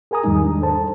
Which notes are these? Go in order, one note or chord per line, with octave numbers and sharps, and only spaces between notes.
G#4 A#4 G#5 A#5 D#6
E2 G#2 D#3 G3 G#3 D#4
D4
A4 C5 A5